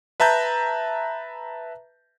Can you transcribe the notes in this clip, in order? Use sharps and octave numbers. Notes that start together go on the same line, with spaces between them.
B4 E5 A5 A#5 G6